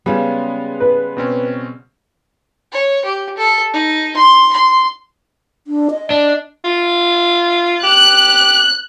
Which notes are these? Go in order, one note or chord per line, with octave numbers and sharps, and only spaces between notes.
C#3 G3 G#3 B3
B4
B2 C4 C#4
C#5
G4
A4
D#4
C6
C6
D4
D#5
D4 D#5
F4
G4 F#6